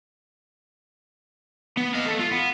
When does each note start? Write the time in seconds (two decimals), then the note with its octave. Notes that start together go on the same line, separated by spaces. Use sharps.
1.77 B3
1.95 D#5 F5
2.06 A3
2.20 F4
2.32 B3